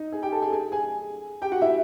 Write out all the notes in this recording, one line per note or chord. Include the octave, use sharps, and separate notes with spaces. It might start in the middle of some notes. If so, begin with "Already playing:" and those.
Already playing: D#4 D#5
G#4 G#5
G4 G5
A4 A5
G#4 G#5
G#4 G#5
G#4 G#5
G4 G5
F#4 F#5
E4 E5